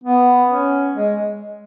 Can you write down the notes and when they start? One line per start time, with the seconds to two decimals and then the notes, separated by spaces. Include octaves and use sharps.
0.04 B3
0.48 C#4
0.93 G#3